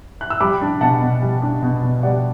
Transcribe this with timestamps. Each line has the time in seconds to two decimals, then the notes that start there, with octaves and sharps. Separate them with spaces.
0.21 F#6
0.30 E6
0.41 G3 B5 D6
0.61 D4
0.81 B2 F#5 A5
1.01 B2
1.22 G3
1.42 D4
1.62 B2
1.83 B2
2.03 G3 D5 F#5